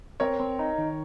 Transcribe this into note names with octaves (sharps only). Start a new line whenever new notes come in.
C4 A#4 C#5
C4
D#4
D#3